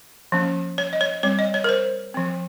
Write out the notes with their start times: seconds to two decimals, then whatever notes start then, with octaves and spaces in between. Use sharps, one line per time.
0.32 F3 A#3 C#4
0.78 C#5
0.93 D#5
1.01 C#5
1.23 G3 C4 C#5
1.39 D#5
1.54 C#5
1.64 A#4
1.69 C5
2.14 F3 C4